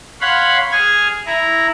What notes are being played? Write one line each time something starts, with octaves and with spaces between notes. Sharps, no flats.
C#5 F5 F#5 B5 C6
G#4 F6 G#6
E4 A#5